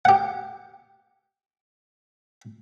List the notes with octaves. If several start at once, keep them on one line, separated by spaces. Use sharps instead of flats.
G4 F#5